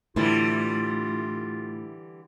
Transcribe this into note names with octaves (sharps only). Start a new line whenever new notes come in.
A2 D3 E3 G3 E4 F4